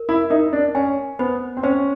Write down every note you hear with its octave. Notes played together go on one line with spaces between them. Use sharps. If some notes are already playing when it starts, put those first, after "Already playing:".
Already playing: A#4
E4
D#4 A#4
D4
C#4 G#5
B3 C5
C4
C#4 C5